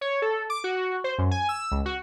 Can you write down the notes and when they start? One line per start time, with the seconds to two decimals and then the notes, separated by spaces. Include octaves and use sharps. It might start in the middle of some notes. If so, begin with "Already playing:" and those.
0.01 C#5
0.22 A4
0.50 D6
0.64 F#4
1.04 C5
1.18 F#2
1.31 G#5
1.49 E6
1.71 C#2
1.86 F#4